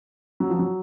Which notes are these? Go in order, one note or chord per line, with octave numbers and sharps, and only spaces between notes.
F#3
F3
F#3